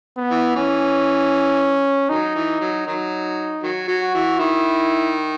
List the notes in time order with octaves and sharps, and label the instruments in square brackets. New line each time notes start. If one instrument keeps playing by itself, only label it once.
[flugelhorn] B3
[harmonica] E3
[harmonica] E3 [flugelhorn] C#4
[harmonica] D#3 F#3 [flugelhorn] D#4
[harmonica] E3
F#3
[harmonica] D#3 F#3 [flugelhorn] D#4
[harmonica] D#3 F#3
F#3
[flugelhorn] F#4
[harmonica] E3
[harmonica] D#3 [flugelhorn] E4